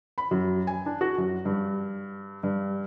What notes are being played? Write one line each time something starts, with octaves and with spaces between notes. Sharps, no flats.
B5
F#2
G#5
D4
F#4
F#2
G2
G2